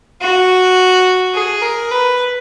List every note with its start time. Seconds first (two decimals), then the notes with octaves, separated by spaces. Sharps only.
0.21 F#4
1.34 G#4
1.62 A#4
1.91 B4